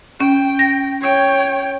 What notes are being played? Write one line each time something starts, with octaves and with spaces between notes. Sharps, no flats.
C#4 G5
A#6
C#5 G5